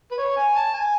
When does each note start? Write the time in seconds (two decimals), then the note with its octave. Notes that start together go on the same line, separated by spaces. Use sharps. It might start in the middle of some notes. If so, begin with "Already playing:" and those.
0.11 B4
0.18 C#5
0.36 G#5
0.55 A5
0.74 G#5